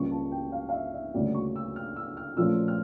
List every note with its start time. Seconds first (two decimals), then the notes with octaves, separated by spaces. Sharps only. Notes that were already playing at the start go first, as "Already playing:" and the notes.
Already playing: C#2 C#3 G3 A#3 C#4 C#6
0.11 A5
0.32 G5
0.52 F5
0.69 F5
0.73 E5
0.94 E5
1.14 D2 C#3 G3 A#3 C#4 D5
1.35 C#6
1.56 E6
1.76 F6
1.96 E6
2.17 F6
2.37 A#2 F3 A3 C#4 E6
2.68 F6